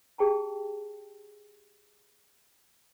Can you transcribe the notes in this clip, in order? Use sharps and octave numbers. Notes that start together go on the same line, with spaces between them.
G4 G#4 G5 A5 A#5